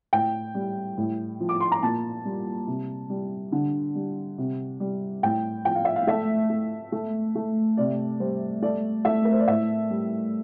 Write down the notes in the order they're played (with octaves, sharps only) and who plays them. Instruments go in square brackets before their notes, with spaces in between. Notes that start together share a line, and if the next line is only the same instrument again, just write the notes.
[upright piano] A2 G5
G3
A2
F3
D6
C6
A#5
A#2 A5
G3
C3
G3
D3
G3
C3
G3
A2 G5
F3 G5
F5
E5
F5
A3 E5
A3
A3
A3
C3 D5
G3 C5
A3 D5
A3 E5
A#4
C5
D5
A2 E5
G3